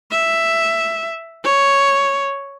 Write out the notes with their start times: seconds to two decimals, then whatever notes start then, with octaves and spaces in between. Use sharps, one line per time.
0.11 E5
1.44 C#5